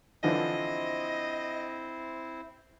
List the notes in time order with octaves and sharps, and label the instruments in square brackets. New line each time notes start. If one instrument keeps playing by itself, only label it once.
[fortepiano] D3 E3 F3 [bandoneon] C4 E4 C5 [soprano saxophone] D#5